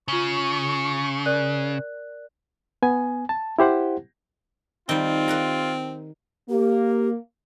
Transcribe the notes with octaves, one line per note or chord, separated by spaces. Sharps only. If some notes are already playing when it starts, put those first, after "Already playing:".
C#3 F4 C#6 F#7 G7
A#4 D5 F#6
B3 G#5
A5
E4 G4 C5 F#5
D#3 G3 C4 F4
A#4 F#5 A#5
A#3 G4